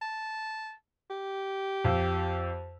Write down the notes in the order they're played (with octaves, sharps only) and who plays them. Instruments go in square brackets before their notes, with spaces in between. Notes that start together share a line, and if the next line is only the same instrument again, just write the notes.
[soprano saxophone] A5
G4
[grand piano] F2 F5 E6